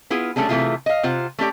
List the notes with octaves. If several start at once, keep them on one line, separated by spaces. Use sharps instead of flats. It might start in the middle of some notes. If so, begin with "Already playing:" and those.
B3 E4 F4 G#4
G3 A3 C#4 D4 G#4
C3 E3 A3 E4 F4 G#4
D#5 F5
C3 F4 C5 F#5
A3 C#4 G4 D5